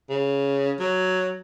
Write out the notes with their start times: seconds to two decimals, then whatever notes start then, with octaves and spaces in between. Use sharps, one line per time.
0.10 C#3
0.80 F#3